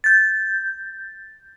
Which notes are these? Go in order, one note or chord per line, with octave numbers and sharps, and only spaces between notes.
G6 A6